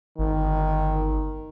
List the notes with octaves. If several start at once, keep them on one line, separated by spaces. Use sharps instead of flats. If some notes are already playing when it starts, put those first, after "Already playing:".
G1 D#3